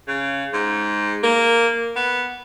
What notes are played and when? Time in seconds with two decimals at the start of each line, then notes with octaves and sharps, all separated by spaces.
0.07 C#3
0.53 G#2
1.23 A#3
1.96 B3